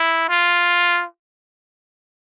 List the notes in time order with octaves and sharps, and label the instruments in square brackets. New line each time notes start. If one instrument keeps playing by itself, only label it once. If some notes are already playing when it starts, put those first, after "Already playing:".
Already playing: [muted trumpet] E4
F4